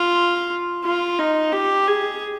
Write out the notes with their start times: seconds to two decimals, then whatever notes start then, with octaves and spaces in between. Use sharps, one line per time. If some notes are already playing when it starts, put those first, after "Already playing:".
Already playing: F4
0.84 F4
1.19 D#4
1.53 G4
1.87 G#4